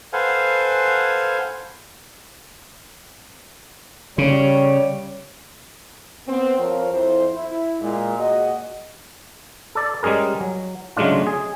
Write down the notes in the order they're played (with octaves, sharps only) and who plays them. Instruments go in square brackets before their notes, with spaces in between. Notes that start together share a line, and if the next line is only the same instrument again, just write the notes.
[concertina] A4 B4 C5 F5 F#5 G#5
[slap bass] C#3 [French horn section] G3 C#5
[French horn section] B3 C4
F2 F3 F4 A#4 C5 C#5
F2 E4 C5
E4
A#2 G#3
A#2 F#4 G#4 D#5
[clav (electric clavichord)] A4 D5
G3 G#3 C#4 G#4 A#4
F#3
C#3 F#3 G#3 A3 D4 F4
G#4